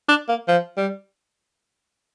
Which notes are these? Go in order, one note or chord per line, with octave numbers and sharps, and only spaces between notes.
D4
A#3
F3
G3